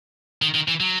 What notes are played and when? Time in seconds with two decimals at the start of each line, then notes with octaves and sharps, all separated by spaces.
0.42 D#3
0.55 D#3
0.68 E3
0.80 F#3